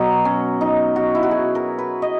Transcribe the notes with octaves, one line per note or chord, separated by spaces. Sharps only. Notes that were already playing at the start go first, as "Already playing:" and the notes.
Already playing: B2 F#3
C#4
D#4
F#4
E4
F#4
G#4
A#4
B4
D#5